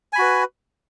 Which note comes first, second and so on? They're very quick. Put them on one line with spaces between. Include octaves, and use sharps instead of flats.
G#5 B5 F#4 B4